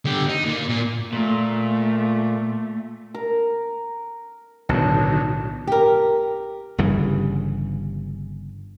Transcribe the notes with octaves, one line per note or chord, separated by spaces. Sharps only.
D3 G4
D#4
A#2
A#2
A#2 A3
A#4
B1 A2 D3 D#3 F#3 A5
G4 A#4
G1 G2 C#3 E3